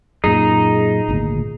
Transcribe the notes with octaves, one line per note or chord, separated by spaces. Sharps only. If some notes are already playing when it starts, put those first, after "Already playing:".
F#2 A#2 D#4 G#4
G#1 D2 A#2